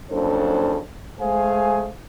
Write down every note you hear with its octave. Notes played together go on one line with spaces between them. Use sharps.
F#1 F2 C#3 D4 A4 C5
G#3 A3 G#4 C5 F5 G#5